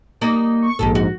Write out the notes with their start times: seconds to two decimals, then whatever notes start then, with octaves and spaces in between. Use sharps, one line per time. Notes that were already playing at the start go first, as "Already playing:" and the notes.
0.21 G3 A#3 D#4
0.62 C#6
0.79 A#1 G#2 D#3 G4 A4
0.95 F#4